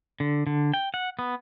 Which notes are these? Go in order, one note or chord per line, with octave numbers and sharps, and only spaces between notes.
D3
D3
G5
F#5
B3